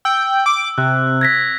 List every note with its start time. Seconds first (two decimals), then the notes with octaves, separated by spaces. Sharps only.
0.05 G5 E6
0.46 D6
0.78 C3 F#6
1.21 G#6 A#6 B6